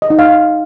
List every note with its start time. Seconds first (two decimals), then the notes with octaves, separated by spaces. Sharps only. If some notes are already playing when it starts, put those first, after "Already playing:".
0.02 D#5
0.10 D#4
0.19 F5